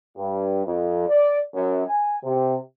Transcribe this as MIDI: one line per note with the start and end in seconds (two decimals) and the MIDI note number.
0.16 0.61 43
0.66 1.04 41
1.08 1.38 74
1.55 1.83 42
1.87 2.18 80
2.23 2.56 48